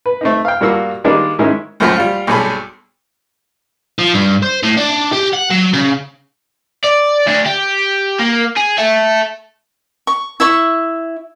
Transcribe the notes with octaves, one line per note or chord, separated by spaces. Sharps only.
B4
A3 C4 D#4
F5 G5
G2 G3 A#3 F4 F#4 E6
D#3 G3 G#3 A#3 D4
G#2 D#3 G#3 C#4 E4
C#2 F#2 F3 A3 F#4 B5
G3 F4
B1 G2 F#3 G#4 A4 B5
F3
G2
C5
A2
D4
G4
F#5
F#3
C#3
D5
D2 D4
G4
A#3
G#4
A4 E5
C#6
E4 E5 C#6